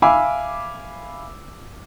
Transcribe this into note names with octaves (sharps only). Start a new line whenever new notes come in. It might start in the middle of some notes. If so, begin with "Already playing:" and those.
E5 F5 G#5 B5 D6 E6